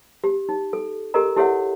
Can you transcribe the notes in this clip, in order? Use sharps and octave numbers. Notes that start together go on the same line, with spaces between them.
G4
D#4
A4
G4 A4 A#4 D#5 A#5
E4 G4 A4 C#5 E5 F#5